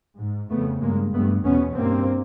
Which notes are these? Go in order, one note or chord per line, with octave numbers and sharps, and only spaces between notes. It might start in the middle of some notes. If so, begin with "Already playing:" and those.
G#2
F2 C#3 A3 B3
G2 G#3 A#3
G2 A3 B3
E2 B2 B3 C#4
G2 A#3 C4